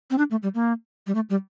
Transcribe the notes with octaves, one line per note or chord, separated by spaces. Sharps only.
C4
D4
A3
G3
A#3
G3
A3
G3